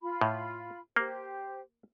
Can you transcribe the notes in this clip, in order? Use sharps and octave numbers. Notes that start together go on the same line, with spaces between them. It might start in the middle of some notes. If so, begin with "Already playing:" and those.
F4 B5
A2
A#3 G4 C5